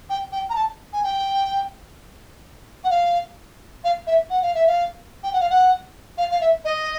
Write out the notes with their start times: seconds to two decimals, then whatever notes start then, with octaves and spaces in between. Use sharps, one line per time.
0.10 G5
0.32 G5
0.50 A#5
0.55 A5
0.93 G#5
1.03 G5
2.84 F#5
2.90 F5
3.84 F5
4.07 E5
4.30 F#5
4.42 F5
4.55 E5
4.67 F5
5.23 G5
5.33 F#5
5.41 F5
5.50 F#5
6.18 F5
6.31 F5
6.41 E5
6.65 D#5